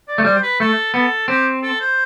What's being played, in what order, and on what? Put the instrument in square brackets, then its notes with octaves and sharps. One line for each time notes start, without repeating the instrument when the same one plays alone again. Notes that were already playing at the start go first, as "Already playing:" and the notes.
[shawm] D5
[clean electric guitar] A3
[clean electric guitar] G3 [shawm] C5
[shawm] B4
[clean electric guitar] A3 [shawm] A4
[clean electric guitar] B3 [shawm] A4
[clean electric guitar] C4 [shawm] G4
[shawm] A4
C5